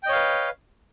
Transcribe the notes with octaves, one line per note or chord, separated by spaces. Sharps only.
B4 C#5 D#5 F5 G5